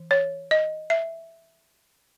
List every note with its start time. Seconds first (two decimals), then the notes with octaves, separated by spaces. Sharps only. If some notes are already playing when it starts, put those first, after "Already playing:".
Already playing: E3
0.11 C#5
0.51 D#5
0.90 E5